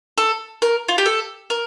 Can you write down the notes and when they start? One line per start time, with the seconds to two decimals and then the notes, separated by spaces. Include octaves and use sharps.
0.18 A4
0.62 A#4
0.88 F4
0.98 G4
1.06 A4
1.50 A#4